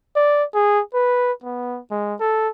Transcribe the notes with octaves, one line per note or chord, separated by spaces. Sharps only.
D5
G#4
B4
B3
G#3
A4